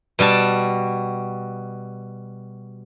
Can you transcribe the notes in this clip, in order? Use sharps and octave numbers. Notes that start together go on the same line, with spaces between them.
B2 G3 F#4 A5